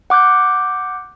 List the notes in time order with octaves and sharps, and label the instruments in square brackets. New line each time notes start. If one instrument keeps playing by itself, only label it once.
[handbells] F#5 D6 F#6 G6